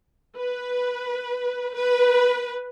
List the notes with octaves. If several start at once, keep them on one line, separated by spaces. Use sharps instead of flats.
B4
B4